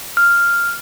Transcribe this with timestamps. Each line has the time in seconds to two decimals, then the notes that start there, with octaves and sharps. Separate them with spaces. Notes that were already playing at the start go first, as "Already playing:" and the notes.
0.17 F6